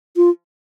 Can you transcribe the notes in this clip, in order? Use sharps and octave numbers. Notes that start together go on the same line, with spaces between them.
F4